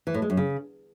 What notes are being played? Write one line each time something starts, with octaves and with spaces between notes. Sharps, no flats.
E3
A2
G#3
F#2
C#3